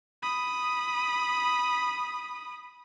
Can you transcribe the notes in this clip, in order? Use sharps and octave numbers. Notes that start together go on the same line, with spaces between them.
B5 D#6